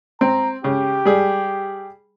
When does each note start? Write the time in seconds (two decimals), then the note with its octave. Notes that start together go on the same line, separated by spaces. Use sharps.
0.21 C4 A#5
0.64 C#3 G4
1.05 G3 G#4